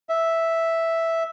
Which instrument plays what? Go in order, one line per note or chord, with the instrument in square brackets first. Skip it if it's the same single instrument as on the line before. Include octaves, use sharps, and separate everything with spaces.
[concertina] E5